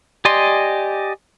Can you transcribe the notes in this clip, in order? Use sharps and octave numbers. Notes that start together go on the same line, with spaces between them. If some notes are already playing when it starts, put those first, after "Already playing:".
G4 D5 D#5 G#5 C6